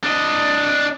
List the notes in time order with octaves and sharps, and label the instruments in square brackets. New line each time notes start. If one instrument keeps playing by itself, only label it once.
[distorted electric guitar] D4 D#5